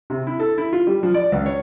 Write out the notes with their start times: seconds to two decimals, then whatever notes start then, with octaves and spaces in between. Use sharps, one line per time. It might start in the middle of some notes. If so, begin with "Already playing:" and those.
0.10 C3
0.27 E4
0.40 A4
0.58 E4
0.73 F4
0.87 G3
1.03 F3
1.14 D5
1.32 C#2
1.46 C#5